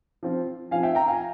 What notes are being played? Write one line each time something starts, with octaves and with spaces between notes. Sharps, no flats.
F3 C4 F4
F3 C4 F4 F5 G#5
E5 G5
G5 A#5
F5 G#5